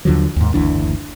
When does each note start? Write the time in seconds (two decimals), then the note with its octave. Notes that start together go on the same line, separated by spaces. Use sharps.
0.05 D#2 D3 F3 F#3
0.36 D#2 G#2
0.54 F#1 D2 E3 D4